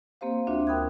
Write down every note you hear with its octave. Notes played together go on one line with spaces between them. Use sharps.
A#3 C4 G4 C5 F5
D2 C4 D4 F4 F#4 E5
A#4 G5 B5 D#6 F#6 G#6